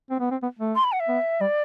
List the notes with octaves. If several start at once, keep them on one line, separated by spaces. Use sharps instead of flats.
C4
B3
C4
B3
A3
C6
B5
F#5
E5
B3
G3 D5